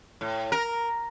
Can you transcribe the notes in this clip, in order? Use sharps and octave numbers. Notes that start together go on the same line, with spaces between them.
A2
A#4